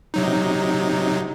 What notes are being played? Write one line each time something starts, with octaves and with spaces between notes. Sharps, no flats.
C3 F#3 D#4